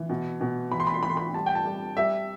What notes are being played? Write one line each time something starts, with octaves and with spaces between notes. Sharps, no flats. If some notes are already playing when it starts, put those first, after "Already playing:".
Already playing: E3
B2
B2
E3 B5
C6
B5
C6
E3 B5
C6
B5
G3 A5
G5
A5
G3
G3 E5